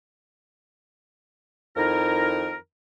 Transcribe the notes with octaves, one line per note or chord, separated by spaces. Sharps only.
F2 D#3 D#4 E4 A#4